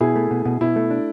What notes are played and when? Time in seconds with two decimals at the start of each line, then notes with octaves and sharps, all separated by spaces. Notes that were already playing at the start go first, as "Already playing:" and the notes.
0.01 B2 E4 G#4
0.16 A3
0.31 B2
0.45 B2
0.61 B2 E4
0.76 A3
0.91 D4